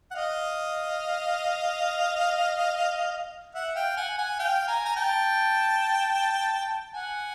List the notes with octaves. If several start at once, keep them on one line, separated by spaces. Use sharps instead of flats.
F#5
D#5 F5
E5 F#5
F5 G5
F#5 G#5
F#5 G#5
F5 G5
G#5 A#5
A#5
G5 A5
F#5 G#5